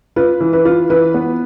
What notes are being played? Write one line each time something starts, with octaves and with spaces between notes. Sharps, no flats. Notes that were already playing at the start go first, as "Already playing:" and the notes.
F4 B4
E3
B4
F4
E3 B4
B3